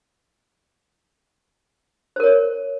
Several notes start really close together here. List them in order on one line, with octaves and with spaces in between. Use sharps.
C5 A#4 C#5